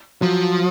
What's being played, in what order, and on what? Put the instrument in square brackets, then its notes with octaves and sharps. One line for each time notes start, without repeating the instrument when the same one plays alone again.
[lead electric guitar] F3 [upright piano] F#3